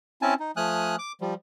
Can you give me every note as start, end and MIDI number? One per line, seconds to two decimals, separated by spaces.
0.22 0.34 60
0.22 0.34 61
0.22 0.34 64
0.22 0.34 80
0.22 0.34 81
0.40 0.51 63
0.57 0.96 53
0.57 0.96 57
0.57 0.96 80
0.57 0.96 87
0.57 0.96 89
0.57 0.96 90
0.99 1.12 86
1.21 1.34 53
1.21 1.34 55